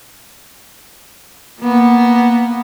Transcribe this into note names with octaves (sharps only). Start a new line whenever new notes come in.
A#3 B3